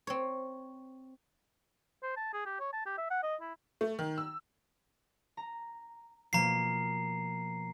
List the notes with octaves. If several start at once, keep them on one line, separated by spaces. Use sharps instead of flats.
C4 C#5
C5
A5
G#4
G4
C#5
A5
G4
E5
F#5
D#5
E4
A3
D#3
E6
A#5
B2 F3 A#3 A#5 C7